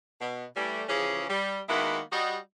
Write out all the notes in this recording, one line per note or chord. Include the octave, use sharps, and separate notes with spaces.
B2
E3 G3 A3
C#3 E3 F3 C#4 G4 G#4
G3
D#3 G#3 A#3 B3 E4 F#4
G3 F#4 D#5